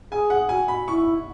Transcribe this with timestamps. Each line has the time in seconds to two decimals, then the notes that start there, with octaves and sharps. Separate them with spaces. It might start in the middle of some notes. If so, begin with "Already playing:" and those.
0.11 G#4 G#5
0.30 F#5
0.49 F#4 G#5
0.68 B5
0.87 E4 C#6